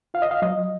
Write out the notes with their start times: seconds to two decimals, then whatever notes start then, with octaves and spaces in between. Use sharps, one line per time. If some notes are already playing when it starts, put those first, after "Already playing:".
0.14 F4 F5
0.22 D#5
0.31 F5
0.42 F#3 D#5